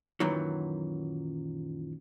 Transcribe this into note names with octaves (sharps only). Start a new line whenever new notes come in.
F#2 A#2 D#3 E3 F#3